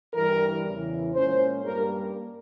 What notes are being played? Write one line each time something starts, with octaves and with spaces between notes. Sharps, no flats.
G2 E3 G3 A#4
E2 C#3 E3
A#2 G#3 C#4 C5
G2 G3 A#3 A#4